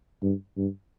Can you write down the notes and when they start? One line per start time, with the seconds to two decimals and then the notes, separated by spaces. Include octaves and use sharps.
0.23 G2
0.57 G2